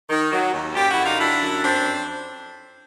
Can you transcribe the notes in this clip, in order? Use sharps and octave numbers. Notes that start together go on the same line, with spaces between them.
D#3
F#3
D#2
F#2 F4 G4
E4 F#4
D3
D#4 F4
F#3 D4 E4
F#2
F2 C4 D4